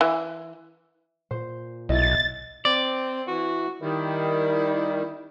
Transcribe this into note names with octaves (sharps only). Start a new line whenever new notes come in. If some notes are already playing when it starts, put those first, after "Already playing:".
E3
A#2 C5
B1 E4 D#5 A6
C4 D5
E3 F#4
D#3 G3 E4